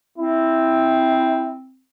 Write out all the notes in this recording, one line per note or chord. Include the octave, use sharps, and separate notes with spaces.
C4 E4